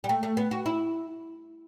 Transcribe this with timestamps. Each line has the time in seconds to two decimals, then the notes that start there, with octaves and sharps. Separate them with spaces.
0.04 G3
0.09 A3
0.23 A3
0.37 B3
0.51 F#4
0.66 E4